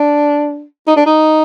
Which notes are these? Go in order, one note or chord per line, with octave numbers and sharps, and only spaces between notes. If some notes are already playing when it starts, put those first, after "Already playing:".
Already playing: D4
D#4
D4
D#4